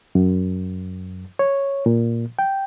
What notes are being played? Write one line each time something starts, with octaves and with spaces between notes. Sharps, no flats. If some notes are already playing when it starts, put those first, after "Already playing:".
F#2
C#5
A#2
G5